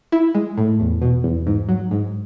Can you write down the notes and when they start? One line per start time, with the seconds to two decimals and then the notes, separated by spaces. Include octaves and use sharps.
0.12 E4
0.35 G#3
0.58 A2
0.80 E2
1.02 B2
1.24 E2
1.47 G#2
1.69 F#3
1.91 G#2